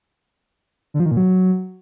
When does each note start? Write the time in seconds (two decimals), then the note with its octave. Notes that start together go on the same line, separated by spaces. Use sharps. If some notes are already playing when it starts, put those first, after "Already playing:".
0.94 D3
1.00 F3
1.06 D#3
1.11 A#2
1.17 F#3